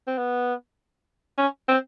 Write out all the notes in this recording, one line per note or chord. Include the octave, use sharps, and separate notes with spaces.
C4
B3
C#4
C4